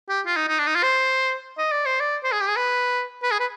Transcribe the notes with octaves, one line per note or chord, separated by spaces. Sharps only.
G4
F4
D#4
D#4
D4
D#4
F4
C5
D#5
D5
C5
D5
C5
G#4
G4
G#4
B4
B4
G#4
B4